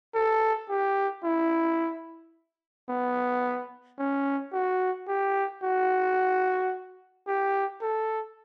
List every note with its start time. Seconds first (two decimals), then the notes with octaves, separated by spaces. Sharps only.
0.14 A4
0.70 G4
1.24 E4
2.89 B3
3.98 C#4
4.52 F#4
5.08 G4
5.63 F#4
7.27 G4
7.82 A4